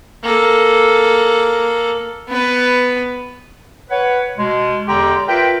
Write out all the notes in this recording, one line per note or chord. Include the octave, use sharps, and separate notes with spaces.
A#3 A4
B3 B4
B4 C#5 F#5
B2 G#3
E2 D3 G#3 G4 G5 A#5
F4 A#4 B4 E5 G5